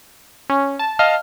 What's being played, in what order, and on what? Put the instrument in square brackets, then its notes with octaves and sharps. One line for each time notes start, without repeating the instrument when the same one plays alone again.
[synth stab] C#4
A5
[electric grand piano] D#5 F5 A5 [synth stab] F6